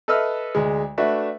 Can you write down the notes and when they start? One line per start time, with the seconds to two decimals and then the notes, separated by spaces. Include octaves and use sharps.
0.08 A4 B4 D#5 E5 E6 F6
0.55 D2 G#3
0.98 A3 D4 F#4 B4 E5